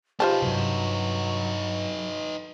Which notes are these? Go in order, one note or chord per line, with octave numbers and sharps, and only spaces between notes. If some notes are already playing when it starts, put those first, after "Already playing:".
D#4 F4 G4 B4 C5 A5
G2 C3 F#3